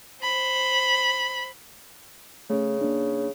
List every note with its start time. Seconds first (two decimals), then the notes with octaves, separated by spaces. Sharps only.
0.23 C5 B5
2.50 C#3 A3 C#4
2.81 A#3 D4